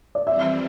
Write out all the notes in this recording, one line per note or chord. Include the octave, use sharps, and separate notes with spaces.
D5
F2 E3 G3 C4 E5